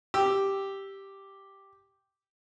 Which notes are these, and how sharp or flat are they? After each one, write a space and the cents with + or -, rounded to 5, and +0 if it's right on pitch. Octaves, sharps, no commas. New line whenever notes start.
G4 +0 E6 +0